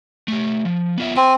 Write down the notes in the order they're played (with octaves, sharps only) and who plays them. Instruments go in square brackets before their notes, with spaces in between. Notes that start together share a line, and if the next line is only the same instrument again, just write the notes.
[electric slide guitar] A3 G4
F3
B3 F4 E5
[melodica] C4 [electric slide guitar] G#5